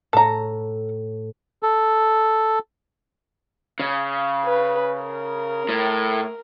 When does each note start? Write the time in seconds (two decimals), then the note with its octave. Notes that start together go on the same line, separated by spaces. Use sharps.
0.13 A2 A4 A#5
1.63 A4
3.79 C#3
4.45 B4
5.02 A#4
5.69 A2